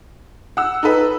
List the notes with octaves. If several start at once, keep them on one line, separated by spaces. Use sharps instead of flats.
F#5 E6
D#4 A4 B4